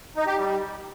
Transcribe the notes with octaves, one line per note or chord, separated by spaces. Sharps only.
D#4
G4
G3